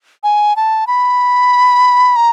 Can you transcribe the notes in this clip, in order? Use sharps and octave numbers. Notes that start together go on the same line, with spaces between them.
G#5
A5
B5
A#5